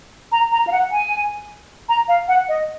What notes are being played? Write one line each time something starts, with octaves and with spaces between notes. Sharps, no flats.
A#5
A#5
F5
F#5
G#5
A#5
F5
F#5
D#5